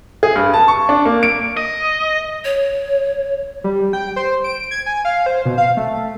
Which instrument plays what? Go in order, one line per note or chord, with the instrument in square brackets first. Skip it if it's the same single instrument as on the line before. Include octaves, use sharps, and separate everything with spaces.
[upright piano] G#4
G2
A5
C#6
D4
A#3
D7
[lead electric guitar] D#5
[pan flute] C#5
[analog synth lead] G3
G5
C5
D7
G#6
G#5
F5
C5
B2
F5
A3